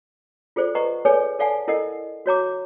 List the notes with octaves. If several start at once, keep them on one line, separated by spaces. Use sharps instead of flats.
F4 G#4 A4 C5 D5
B4 D#5 F#5 A#5 C#6
G#4 A4 B4 C#5 D5 G#5
A4 D5 F5 F#5 G#5 A5
E4 A4 A#4 D#5 F#5
F#4 C#5 A#5 D6